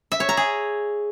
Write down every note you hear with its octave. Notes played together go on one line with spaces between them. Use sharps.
E5
C#5
A#5
G#4